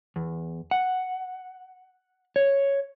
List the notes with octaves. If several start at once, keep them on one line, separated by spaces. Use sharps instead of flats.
E2
F#5
C#5